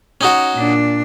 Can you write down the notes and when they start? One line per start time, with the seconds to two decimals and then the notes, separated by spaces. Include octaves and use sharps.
0.21 C#4 D#4 F#4
0.56 A#2 D4